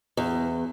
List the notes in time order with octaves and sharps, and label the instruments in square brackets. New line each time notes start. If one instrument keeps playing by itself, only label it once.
[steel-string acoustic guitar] E2